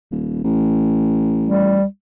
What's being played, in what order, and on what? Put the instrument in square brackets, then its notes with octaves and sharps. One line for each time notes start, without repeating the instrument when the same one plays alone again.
[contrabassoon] D#1
A1
[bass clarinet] G3